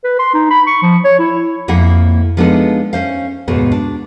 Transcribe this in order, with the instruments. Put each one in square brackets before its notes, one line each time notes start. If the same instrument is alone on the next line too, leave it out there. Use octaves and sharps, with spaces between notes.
[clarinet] B4
C6
D#4
B5
C#6
F3
C#5
E4
[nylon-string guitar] F2 F3 A#3 E4 F#5
F3 G#3 B3 D4 D#4 A4
C#4 C5 F5
D#2 G#2 B2 B3
D4